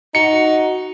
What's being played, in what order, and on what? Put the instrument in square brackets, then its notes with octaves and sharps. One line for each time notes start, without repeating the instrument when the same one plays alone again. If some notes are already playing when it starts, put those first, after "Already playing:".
[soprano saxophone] D#4 [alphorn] F#4 [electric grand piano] C#7